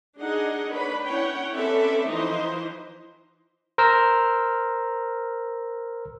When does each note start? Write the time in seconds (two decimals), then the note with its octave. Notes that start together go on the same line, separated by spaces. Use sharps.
0.19 D4 D#4 G#4 D#5 F#5
0.72 D4 B4 C#5 B5
1.04 C#4 E4 C#5 F#5 G5
1.54 C4 C#4 A4 B4 D5 E5
2.10 E3 F3 D#4 C5 D#5
3.78 A#4 C5 A#5 E6 F6